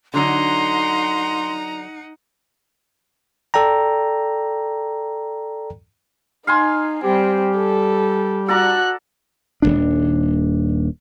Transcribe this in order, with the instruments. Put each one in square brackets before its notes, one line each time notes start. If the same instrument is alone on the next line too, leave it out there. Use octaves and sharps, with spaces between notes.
[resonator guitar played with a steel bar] D3 F#3 D4 [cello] D#4 F#5 [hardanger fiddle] A#5 [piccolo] C6
[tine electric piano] A4 D5 G5 A#5
[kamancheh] D#4 [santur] F5 G#5 C6
[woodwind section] G3 G4 [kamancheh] C4
[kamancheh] A4
[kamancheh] F#4 F#6 [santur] A4 D5 A#5
[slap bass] D#1 G#1 D4